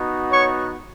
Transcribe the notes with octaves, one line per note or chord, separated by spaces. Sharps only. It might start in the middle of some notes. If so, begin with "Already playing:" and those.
Already playing: B3 D#4 F#4
C#5 C#6